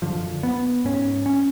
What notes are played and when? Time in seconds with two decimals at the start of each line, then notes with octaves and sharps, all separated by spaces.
0.02 F#2 D3 F3
0.43 B3
0.85 G#2 C#4
1.26 C#4